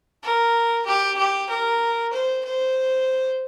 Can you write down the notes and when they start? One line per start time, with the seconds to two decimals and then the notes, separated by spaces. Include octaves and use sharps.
0.23 A#4
0.86 G4
1.18 G4
1.50 A#4
2.13 C5
2.44 C5